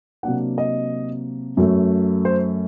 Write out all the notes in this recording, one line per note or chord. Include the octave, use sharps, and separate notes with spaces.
C3 F#3 A#3 D4 F#5
D#5
F#2 F#3 A3
C5